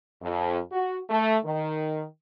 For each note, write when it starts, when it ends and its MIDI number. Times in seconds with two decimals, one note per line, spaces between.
0.22 0.58 41
0.72 0.98 66
1.10 1.36 57
1.45 2.04 51